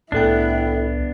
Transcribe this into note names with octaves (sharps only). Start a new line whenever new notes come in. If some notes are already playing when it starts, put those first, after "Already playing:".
C2 A2 B3 D4 E4 A4 G5